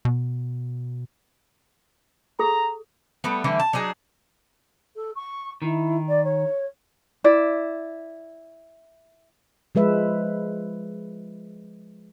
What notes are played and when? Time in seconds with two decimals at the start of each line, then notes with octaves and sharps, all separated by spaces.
0.05 B2
2.39 G#4 A4 A#5
3.24 G3 A3 B3
3.44 D3 E3 G3 A3
3.60 A5
3.73 F#3 D4 D#4 G#4
4.95 A4
5.15 C#6
5.62 D#3 E4
6.08 D5
6.24 C#5
7.24 E4 D5
9.75 F3 G#3 B4 E5